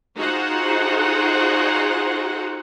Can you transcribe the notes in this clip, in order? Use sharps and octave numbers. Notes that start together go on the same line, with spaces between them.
D#4 F4 F#4 G#4 C5 F#5